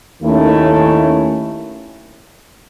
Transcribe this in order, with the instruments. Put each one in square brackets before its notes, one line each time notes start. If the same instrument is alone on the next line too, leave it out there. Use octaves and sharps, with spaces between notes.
[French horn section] D#2 D#3 A3 C#4 E4